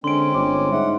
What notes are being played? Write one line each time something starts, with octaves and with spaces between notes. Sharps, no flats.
D3 G#3 C4 C#4 C6 D7
G1 C#5 D6
G#2 E5 F#5